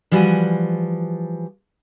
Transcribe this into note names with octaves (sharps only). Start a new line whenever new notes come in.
E3 F3 G3 F#4 G#5